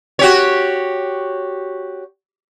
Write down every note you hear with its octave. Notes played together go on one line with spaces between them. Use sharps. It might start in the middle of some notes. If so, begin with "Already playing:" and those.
F#4 G4 C#5